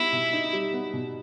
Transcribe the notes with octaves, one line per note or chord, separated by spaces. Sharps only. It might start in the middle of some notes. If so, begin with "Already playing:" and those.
Already playing: G3 B3 D#4 E4
B2
D#4
G3
B3
B2